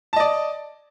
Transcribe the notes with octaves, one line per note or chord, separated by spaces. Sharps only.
D5 D#5 A5